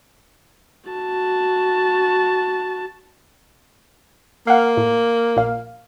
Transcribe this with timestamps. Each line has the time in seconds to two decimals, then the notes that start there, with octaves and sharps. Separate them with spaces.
0.90 F#4 A5
4.47 A#3 F5 F#5
4.77 A2
5.37 A#1 A#2 F5